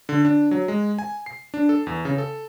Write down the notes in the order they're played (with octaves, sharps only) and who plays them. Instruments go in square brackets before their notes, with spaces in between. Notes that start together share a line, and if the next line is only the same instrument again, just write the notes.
[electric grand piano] D3
D4
F#3
G#3
G#5
C7
D4
A4
E2
C#3
A4